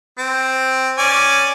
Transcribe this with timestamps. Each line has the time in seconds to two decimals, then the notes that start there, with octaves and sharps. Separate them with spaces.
0.18 C4
0.98 C#4 D5 G#5